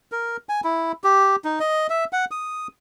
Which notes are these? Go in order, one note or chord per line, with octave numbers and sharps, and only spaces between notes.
A#4
G#5
E4
G4
D#4
D#5
E5
F#5
D#6